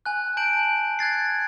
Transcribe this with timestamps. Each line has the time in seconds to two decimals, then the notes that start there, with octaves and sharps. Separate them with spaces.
0.06 G#5 F#6
0.37 A5 G6 D7 F#7
0.99 F#6 G#6 A6 C7